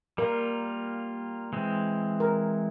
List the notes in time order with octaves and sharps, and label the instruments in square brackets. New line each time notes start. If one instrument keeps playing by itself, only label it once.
[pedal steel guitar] G3 A#3 F4 [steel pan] A#4
[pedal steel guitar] E3 G#3 C4
[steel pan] A#4